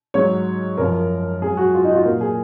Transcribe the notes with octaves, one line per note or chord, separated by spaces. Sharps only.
G#2 F#3 C#5
F#2 F3 A#4
G#2 F#3 G#4
F#4
F4
D#4
F#4
F4
A#2 F#3 A#4
G#4